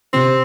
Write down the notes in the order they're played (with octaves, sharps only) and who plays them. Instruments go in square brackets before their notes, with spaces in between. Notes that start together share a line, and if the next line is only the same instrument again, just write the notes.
[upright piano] C3 [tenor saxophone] C4